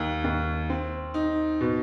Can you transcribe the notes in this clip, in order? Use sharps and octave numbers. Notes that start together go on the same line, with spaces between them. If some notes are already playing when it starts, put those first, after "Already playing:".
Already playing: D#2
D#2
C4
D#4
B2